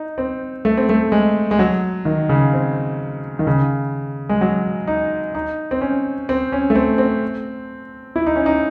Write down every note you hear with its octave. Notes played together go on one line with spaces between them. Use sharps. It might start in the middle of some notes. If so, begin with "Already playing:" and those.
Already playing: D#4
C4
A3
C4
A3
G#3
G#3
F#3
D#3
C#3
C4
D#3
C#3
G#3
F#3
D#4
D#4
C4
C#4
C4
C#4
A3
C4
C4
E4
D#4
C#4
D#4